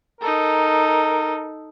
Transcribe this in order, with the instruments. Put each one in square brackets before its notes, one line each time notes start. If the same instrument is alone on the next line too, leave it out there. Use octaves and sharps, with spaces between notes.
[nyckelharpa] D#4 A4 [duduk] A#4